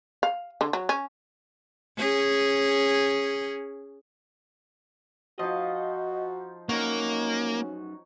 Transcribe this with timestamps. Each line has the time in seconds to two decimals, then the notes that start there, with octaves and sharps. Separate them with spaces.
0.23 F5
0.61 D3
0.73 F#3
0.89 C#4
1.97 C#4 G#4
5.39 F3 D#4 F#4 D#5
6.69 F#2 A#3 C#4 D#4 F#4 C#5